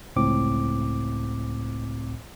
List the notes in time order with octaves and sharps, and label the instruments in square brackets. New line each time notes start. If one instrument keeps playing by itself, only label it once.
[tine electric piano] G1 C#2 A2 C4 D6